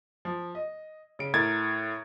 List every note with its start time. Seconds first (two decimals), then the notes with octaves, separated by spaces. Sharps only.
0.25 F3
0.55 D#5
1.19 C#3 D7
1.34 A2 A#4 G#6 A6